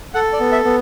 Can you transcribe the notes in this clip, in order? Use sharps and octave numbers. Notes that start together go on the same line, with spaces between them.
A4 F#5
D5
B3
E5
B3